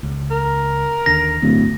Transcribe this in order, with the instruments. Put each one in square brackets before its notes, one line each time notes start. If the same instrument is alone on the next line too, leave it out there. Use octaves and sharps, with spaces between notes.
[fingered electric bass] C#2
[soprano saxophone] A#4
[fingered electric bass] D#2 D3 [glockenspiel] A#6
[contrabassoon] D1 [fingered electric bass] G1 D2